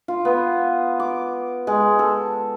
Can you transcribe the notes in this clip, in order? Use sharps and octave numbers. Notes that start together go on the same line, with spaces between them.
F4
B3
D6
G#3
A4